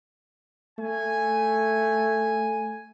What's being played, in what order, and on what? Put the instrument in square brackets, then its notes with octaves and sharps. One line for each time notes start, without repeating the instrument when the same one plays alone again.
[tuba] A3 [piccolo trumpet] G#5